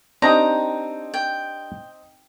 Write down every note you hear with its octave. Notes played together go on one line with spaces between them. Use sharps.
C4 D4 D#4 G4 D#5 A#5
G5